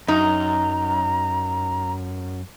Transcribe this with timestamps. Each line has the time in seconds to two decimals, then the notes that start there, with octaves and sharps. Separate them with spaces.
0.08 F#2 D#4 A#5